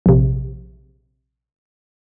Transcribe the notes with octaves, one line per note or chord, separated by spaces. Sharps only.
A#1 C3